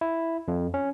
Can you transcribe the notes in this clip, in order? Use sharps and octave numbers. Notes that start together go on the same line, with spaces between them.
E4
F2
C#4